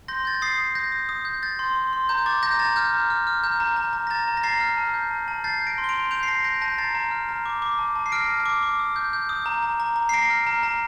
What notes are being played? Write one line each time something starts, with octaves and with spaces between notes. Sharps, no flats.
C6 G6 A#6
G6 A6
A#6
D#6 A6 C7
D#6
G6 A#6
D#6
D#6
G6
G6 A6
C6
C6
C6
A#5 G6
D6 A6
A#5 G6 A#6
A#5 A6
F6 G6
A#5
F6
F6
A#5 G6
A#5
A#5
A#5
A#6
A#5 A6
A#5
A#6
A#5 A6 C7
F6
A5
G6
A5
A5
G6 A6 C7
G6
A#6 D7
C6
G7
D7 F7
C6
G6 D7 F7
C7
A5 A#6 D7
G6 A#6 D7
A5 G6 A#6
A#5 A6 C7
A#5
F6
A#5
D6
D6
A5
A5
C7
F6 A#6 D7
A5
D6
D6
D#6
G6
G6
D#6
A#5
A#5
A#5
A#5
C7
A#5 A#6 D7
F6
A#5
A#5